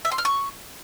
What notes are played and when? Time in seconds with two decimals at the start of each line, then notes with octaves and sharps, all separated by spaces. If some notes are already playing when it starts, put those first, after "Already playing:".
0.05 E5
0.11 C6
0.18 F6
0.25 C#6